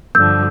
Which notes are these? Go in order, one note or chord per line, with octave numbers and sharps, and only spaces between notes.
G2 D3 F3 E6 G6